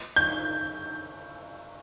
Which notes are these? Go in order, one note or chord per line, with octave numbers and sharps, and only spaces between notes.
G6